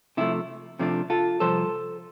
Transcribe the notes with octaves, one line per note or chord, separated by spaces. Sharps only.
C3 F3 A3 E4
C3 F3 A3 D4
F4 A4
C2 C3 F3 A4 C5